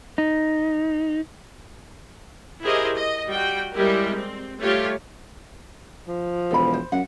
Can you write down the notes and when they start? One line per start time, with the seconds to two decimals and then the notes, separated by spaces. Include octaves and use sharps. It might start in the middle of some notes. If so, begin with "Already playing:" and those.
0.18 D#4
2.63 E4 G4 G#4 A#4 C5 D#5
2.93 D#5
3.28 G3 F#4 G5
3.74 G3 G#3 E4 G4 A#4
4.14 C4
4.60 G3 A3 F4 G4 C#5 F5
6.08 F3
6.51 E1 A4 B5
6.73 C5
6.92 F#2 F#5